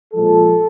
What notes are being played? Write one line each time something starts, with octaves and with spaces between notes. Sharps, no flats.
A#2 F3 G#3 A4